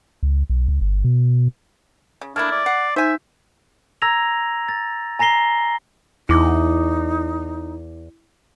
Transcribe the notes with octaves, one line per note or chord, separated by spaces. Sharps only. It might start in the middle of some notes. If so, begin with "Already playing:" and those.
C#2
B1
C#2
G1
B2
C#3
A3 A#3 D4 E4 F6 G#6 A6
D5
F#5 C7
D#4 C5 E5 G#5 G6
A#5 E6 G#6 A#6 F7
A6
G#5 A#5 A#6 C7 G7
E2 D#4 E4 D6